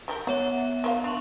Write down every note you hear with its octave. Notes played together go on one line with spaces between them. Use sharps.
G3 G4 A#4
B3 C#5 E5 F#5
A#3 C5 F5
D4 C6 C#6